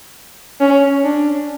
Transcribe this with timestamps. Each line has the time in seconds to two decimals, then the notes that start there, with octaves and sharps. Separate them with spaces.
0.60 C#4
1.04 D4